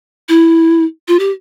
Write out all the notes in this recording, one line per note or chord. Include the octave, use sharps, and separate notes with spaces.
E4
F4
G4